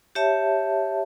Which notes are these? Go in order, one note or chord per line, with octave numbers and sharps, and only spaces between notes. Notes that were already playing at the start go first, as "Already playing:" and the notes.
G4 C#5 E5 A5